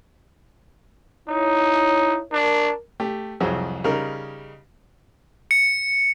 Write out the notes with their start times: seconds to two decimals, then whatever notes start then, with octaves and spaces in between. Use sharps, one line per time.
1.28 D#4 E4 C#5
2.32 D4 A#4
3.00 A3 G4
3.40 C2 F2 F#3 G#4 C5
3.84 C#3 G3 D#4 A#4
5.51 C#7